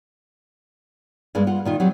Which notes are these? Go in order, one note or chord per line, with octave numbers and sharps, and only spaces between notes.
G2 G#3 A#3
F4 F#5
A#2 D#3 F4
F#3 G3 C4